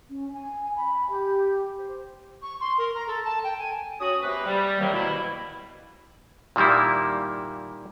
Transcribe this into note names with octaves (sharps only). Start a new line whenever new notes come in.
C#4
G#5
B5
G4
C5
C#6
C6
A#4
A#5
A4
A5
G5
G#5
C#4 F#4 D#6
C3 A#3 B4
G3
C3 D#3 F#3 A#3
B2 E4
A#2 D#3 G3 A#3 E4